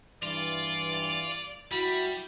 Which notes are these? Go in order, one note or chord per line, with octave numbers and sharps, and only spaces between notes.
G2 E3 F4 D5
G3 E4 F#4 B5